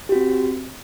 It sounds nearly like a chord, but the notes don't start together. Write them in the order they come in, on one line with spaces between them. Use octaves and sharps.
G4 F#4 C4